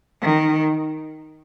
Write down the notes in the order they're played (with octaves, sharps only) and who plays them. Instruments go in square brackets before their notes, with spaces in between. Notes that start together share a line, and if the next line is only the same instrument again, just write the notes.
[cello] D#3